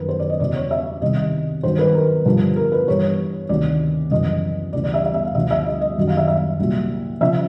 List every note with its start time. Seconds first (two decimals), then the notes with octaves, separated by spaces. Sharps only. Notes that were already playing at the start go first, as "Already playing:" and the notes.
Already playing: F#2 D#3 F#3 A#4 B4
0.09 C5
0.19 D5
0.29 D#5
0.40 E2 C#3 F#3 D5
0.55 C#5
0.71 E5
1.02 C2 C3 D#3 D#5
1.63 G2 D#3 F#3 C5
1.79 B4
1.94 A#4
2.25 G2 D3 F3
2.56 A#4
2.72 B4
2.87 G2 E3 C#5
3.49 D2 C3 D#3 D5
4.11 F#2 C#3 E3 D#5
4.73 D2 C#3 E3 D5
4.84 D5
4.94 E5
5.04 E5
5.14 E5
5.25 F5
5.35 D2 D3 F3 E5
5.51 E5
5.66 D#5
5.81 D#5
5.97 F#2 D#3 F#3
6.07 F5
6.17 E5
6.28 E5
6.59 C2 A#2 F#3
7.21 C#3 F3 E5